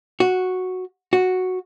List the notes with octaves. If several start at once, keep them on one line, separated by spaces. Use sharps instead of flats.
F#4
F#4